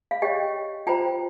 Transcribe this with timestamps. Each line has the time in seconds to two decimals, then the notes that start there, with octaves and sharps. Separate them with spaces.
0.11 F5
0.22 G4 C#5 D#5 G5
0.87 F4 C5 G5 A#5